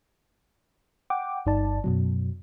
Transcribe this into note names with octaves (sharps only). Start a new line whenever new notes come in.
F#5 G5 D6
G1 G2 D#4 D5 A5
F#2 B2 F#3